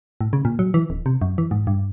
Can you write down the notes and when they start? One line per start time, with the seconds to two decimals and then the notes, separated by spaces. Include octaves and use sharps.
0.21 A2
0.33 C#3
0.45 A#2
0.59 F#3
0.74 E3
0.90 D1
1.06 C3
1.22 F#2
1.38 E3
1.51 G#2
1.67 G2